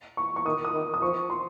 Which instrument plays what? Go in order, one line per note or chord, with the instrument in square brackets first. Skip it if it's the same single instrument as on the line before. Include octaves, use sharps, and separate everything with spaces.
[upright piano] C#6
C#6
[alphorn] D#3 [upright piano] D#6
[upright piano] D#6
[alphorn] D#3
[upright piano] D#6
[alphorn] F3 [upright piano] C#6
[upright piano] C6